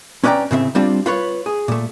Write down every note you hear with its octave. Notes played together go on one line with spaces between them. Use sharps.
C#4 B4 D5 D#5 G5 A#5
A2 C#3 C4 E5
G3 C4 D4 F4
F4 B4 C#5
G#4
A#2 A3